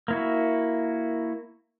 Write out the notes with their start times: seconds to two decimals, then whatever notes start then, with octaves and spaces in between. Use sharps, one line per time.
0.08 A#3 E4 F#4